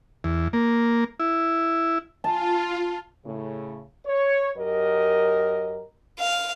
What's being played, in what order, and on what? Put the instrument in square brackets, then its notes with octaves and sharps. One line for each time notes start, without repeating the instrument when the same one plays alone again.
[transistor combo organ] E2
A#3
E4
[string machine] F4 [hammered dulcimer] A5
[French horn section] A2 C#3
C#5
F#2 G4 A#4 D#5
[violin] F5